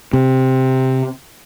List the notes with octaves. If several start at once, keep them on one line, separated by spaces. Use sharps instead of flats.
C3